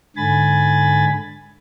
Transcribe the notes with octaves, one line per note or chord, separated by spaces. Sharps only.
G#2 D3 G#5 B5 A6